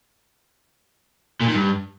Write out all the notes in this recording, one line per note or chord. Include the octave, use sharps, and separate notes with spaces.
A#2
D#3
G2